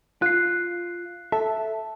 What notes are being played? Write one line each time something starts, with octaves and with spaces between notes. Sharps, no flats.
F4 F#6 C7
A4 E5